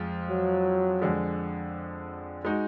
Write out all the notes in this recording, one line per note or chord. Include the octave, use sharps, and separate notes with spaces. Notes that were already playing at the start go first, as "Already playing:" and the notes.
Already playing: F2 F3 G#3 F4
F#3
F2 D3 G#3
G#3 D#4 F#4